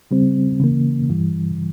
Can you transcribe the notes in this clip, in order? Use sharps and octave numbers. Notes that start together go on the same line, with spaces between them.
C#3 G3 C4
C#3 E3 A#3
G2 E3 G3